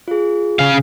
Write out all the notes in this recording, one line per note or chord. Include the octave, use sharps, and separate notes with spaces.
F4 G#4
C#3 F5